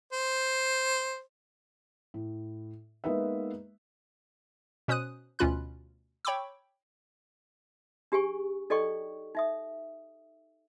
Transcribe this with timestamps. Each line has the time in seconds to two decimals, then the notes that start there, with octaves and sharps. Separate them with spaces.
0.13 C5
2.14 A2
3.04 G#3 A#3 B3 D#4 B4 E5
4.88 B2 C#4 C5 D#6 F#6 D#7
5.39 D2 B2 C#4 F4 B5 F#6
6.25 C#5 G5 B5 C#6 D6 E6
8.12 D4 G4 G#4 G#5 C#6
8.70 D#4 A4 D5 D#5 G5 C#6
9.35 D#4 E5 D#6